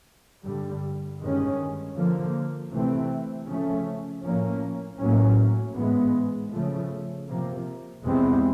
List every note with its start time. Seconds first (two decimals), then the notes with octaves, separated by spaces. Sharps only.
0.44 G2 D3 G3
1.21 G2 D#3 G#3 C#4
1.97 D3 F3 A#3
2.72 C3 E3 A3 C4
3.48 C#3 F3 A3 C#4
4.24 A2 F3 A#3 C#4
5.00 A2 F#3 A#3 C#4
5.76 G#2 E3 G#3 B3
6.52 C#3 F3 A3
7.28 C3 F3 A#3
8.04 E2 C3 E3 G#3 C4